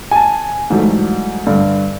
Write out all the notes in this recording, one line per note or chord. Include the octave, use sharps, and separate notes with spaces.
G#5 A5
G#2 E3 F#3 G3 A3
G2 D3